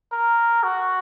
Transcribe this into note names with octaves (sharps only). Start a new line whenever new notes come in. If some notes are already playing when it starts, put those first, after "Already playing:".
A#4
F#4